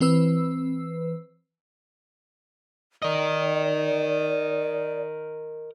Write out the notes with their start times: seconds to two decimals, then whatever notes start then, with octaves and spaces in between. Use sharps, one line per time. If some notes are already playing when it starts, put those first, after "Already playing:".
0.01 E3 C4 B4 E6
3.02 A#4 D5 D#5